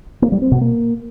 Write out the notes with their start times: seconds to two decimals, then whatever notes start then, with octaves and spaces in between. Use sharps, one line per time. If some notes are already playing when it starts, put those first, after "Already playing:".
0.22 A#3
0.32 G3
0.42 C4
0.52 B2
0.61 A#3